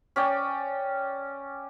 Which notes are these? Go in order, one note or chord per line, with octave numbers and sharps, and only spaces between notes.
C#4 D5 G5